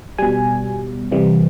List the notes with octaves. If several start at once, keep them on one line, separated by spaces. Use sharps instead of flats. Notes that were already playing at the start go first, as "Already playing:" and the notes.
B2 G3 G#5
C3 E3 G3